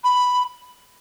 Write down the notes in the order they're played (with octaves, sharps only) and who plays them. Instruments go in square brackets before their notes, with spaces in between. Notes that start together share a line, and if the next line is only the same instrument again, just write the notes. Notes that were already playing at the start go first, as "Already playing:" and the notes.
[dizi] B5